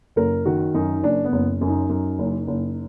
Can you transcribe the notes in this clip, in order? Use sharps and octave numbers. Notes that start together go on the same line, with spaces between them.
F#1 A#4
D#3 F#4
F#2 D#4
F#1 D4
B3
F#1
F#2
D#4
F#2
F#1
F#1